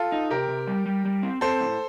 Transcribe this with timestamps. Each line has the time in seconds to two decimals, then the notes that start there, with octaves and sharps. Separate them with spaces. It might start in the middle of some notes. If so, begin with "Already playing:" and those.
Already playing: F4 A4
0.12 D#4
0.30 C3 G4 A#4
0.49 C3
0.67 G3
0.86 G3
1.05 G3
1.23 C4
1.41 C4 A4 C5
1.60 A2